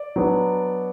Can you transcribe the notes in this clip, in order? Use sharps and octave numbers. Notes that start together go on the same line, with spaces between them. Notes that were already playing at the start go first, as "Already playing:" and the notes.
Already playing: D5
F#3 B3 D4